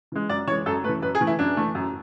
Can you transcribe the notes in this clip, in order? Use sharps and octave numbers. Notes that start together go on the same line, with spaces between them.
E3 G#3
F#2 D5
E3 G#3 C#5
F#2 A4
A3 B4
E3
F#2 B4
G#4
E3 A3
E4
F#2 D4
E3 A3
F#2